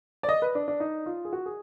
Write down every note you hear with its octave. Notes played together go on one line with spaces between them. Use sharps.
D5
D#5
B4
D4
D4
D#4
F4
G#4
F#4
G#4